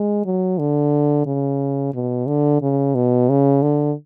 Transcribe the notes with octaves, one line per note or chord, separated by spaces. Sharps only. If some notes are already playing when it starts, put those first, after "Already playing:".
Already playing: G#3
F#3
D3
C#3
B2
D3
C#3
B2
C#3
D3